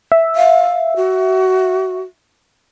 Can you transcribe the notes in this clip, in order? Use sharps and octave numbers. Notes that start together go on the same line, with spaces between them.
E5
F5
F#4